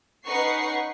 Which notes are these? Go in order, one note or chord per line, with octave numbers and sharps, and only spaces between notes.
C#4 D#4 B4 F#5 C#6 C7